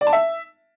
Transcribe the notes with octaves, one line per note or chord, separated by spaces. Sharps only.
D5
A5
E5